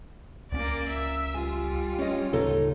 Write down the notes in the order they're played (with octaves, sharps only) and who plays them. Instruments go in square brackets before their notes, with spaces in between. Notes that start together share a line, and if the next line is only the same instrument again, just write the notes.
[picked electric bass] C#2 B3 C#4 [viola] A#3 D5
[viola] E5
[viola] G3 F4 [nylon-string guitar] G#5
[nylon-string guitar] C#4 D#5
[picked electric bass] D1 C#3 A#3 [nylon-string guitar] D#4 A4 C#5